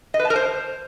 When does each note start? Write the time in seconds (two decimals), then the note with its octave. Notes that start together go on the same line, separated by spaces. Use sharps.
0.14 D#5
0.19 B4
0.25 A5
0.30 A#4
0.36 C5